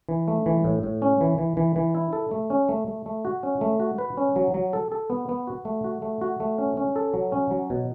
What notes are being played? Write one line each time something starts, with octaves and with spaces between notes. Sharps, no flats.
E3
A3
E3
A2
A2
C#4
E3
E3
E3
E3
E4
A4
A3
C#4
A3
A3
A3
F#4
C#4
A3
F#4
B4
C#4
F#3
F#3
A4
A4
B3
B3
F#4
A3
F#4
A3
F#4
A3
C#4
C#4
A4
F#3
C#4
F#3
B2